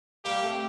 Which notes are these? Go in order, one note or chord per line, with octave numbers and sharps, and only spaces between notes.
G3 A#3 G4
A3 C4